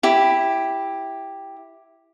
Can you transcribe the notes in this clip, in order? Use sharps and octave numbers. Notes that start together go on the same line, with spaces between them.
E4 G4